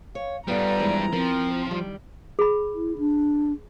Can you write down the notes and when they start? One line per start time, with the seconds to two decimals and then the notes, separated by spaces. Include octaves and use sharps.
0.15 C#5 F5
0.48 G2 G3 B3 F4 A4 D5 A#5
0.79 E3 F3 G#3
1.13 F3 C4 A#4
1.67 D#3 G3
2.39 G#4 B5
2.74 E4
2.98 D4